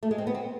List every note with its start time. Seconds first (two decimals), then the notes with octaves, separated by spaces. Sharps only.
0.03 A3
0.11 G#3
0.18 C4
0.27 B3
0.35 C4